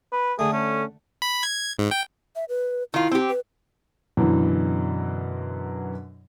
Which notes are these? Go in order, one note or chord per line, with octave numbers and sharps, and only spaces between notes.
B4
D3 A3 G#4
C#4
B5
G#6
G#2
G5
E5
B4
D#3 E4 F4
C4 G4
B4
F#2 B2 D3 E3 F#3